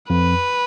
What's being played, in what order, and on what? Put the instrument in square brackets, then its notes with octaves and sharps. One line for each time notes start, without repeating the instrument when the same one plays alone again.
[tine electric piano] F2 [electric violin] B4